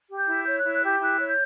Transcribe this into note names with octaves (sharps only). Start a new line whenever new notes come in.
G4
G6
E4
C#5 G6
E4 F#6
F#6
G4 G6
E4 F#6
C#5
G6